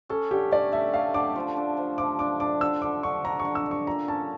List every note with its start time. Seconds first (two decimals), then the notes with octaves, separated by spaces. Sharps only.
0.09 C#4 A4
0.31 D3 G4
0.51 A3 D5
0.72 A3 E5
0.94 A3 F5
1.14 D3 D6
1.36 F3
1.57 D4
1.77 F3
1.98 F3 D6
2.19 D4 D6
2.40 D4 D6
2.61 D3 E6
2.82 D3 D6
3.03 D3 C#6
3.25 D3 A#5
3.40 C#6
3.45 D3
3.55 E6
3.66 D3
3.71 C#6
3.87 A#2 A#5
4.08 C#4 A5